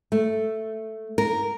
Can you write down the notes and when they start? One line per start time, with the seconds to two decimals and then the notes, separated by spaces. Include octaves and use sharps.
0.12 A3
1.18 A#4